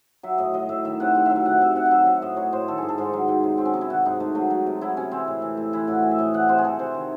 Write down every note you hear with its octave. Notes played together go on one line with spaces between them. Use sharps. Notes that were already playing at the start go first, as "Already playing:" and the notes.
F#3 E5
A2 D#5
F#3 D#5
A2 E5
D#3 E5
C3 F#5
C3 F#5
F#3 E5
E5
D#3 F#5
C3 E5
C3 F#5
F#5
F#3 E5
F#3 E5
A2 D#5
F#3 C#5
A2 C5
D#3 A4
G#2 G#4
A4
G#2 C5
F#3 D#4
F#3
C3
F#3 C4
C#4
C3 D#4
E4
D#3 F#4
G#2 D#4
G#2 A3
F#3 A3
F#3
C3
F#3 E4
C3 C#4
E3 C4
A2
E3
A2
E3 E4
A2 F#4
E3
E5
A2 D#5
E3 F#5
C3 C5
G#4
E3 A4
C3 C5
D#3